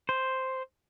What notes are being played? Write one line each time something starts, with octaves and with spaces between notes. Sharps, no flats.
C5